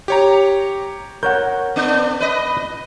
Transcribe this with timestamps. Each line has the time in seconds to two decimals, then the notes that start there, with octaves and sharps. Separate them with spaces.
0.08 G4 C#5 A#5
1.23 A#4 C#5 F#5 G6
1.76 B3 D4
2.20 B4 D#5